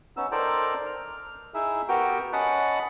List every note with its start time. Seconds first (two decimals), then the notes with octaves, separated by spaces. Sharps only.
0.17 B3 C#4 D#4 E6
0.32 D#4 A4 A#4 C5 D5 G5
0.86 F6
1.54 D#4 E4 G#4 E5
1.89 B3 F#4 G4 A#4 G5
2.33 C#4 D#5 F#5 A5 B5 F#6